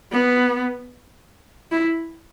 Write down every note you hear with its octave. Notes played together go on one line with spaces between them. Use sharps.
B3
E4